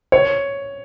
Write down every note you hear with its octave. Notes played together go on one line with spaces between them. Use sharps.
C#5